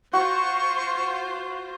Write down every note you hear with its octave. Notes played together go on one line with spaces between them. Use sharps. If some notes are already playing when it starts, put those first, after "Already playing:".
F4 F#4 C5 C#6